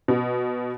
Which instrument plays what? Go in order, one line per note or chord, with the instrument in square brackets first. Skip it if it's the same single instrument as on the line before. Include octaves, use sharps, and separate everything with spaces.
[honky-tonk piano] B2